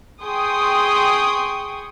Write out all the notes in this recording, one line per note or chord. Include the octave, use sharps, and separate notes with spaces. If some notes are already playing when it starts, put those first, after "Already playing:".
G#4 G5 C6 C#6 D#6